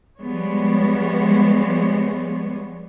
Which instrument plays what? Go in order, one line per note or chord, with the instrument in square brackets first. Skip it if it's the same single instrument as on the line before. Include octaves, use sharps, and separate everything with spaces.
[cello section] F3 G3 G#3 B3 C#5